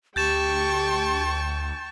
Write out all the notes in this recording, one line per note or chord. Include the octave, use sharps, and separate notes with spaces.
D2 G4 G5 A5 C#6 G6 A6 E7